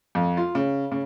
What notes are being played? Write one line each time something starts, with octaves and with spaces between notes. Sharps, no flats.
F2
F4
C#3
C#3